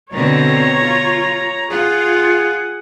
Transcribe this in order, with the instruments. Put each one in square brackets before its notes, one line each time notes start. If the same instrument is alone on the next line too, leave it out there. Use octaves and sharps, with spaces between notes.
[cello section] B2 D3 C4 [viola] C#5 A#5
[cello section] F4
[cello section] F4 [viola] G#4 F#5